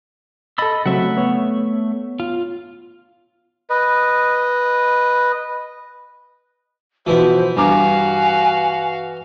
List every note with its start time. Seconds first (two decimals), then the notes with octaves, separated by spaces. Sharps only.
0.58 A4 D#5 B5 E6 A6
0.86 C#3 F#3 A3 C4 E5 F#5
1.17 B3 C#5
2.20 F4
3.70 B4 D#5
7.07 B2 E3 F3 E4 C5 E5
7.56 G2 F#4 F5 G#5 A#5 D6